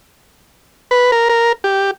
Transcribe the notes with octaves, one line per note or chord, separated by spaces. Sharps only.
B4
A#4
A#4
G4